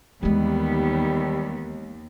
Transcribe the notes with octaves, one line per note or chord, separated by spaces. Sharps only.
D#2 E3 G3 G#3 B3